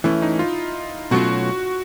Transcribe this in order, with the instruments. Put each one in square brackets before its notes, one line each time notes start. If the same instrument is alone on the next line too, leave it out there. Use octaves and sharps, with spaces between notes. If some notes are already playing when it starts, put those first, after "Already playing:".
[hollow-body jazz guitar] E3 A3 C#4 [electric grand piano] E4
[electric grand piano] D#4
F4
[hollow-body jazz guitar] B2 F#3 A3 C#4 F4 [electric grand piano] F#4